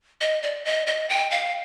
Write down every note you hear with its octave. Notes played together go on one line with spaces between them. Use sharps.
D#5
D5
D#5
D#5
G5
F5